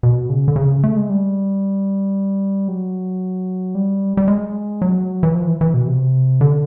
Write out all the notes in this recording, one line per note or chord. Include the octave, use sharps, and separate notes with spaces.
B2
C#3
D3
C#3
A3
G#3
G3
F#3
G3
G3
G#3
F#3
E3
F3
E3
E3
B2
C3
D3